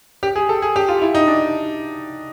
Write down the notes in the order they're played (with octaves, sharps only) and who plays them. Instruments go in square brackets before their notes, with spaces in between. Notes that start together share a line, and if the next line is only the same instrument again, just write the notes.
[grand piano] G4
G#4
A4
G#4
G4
F4
E4
D#4
D4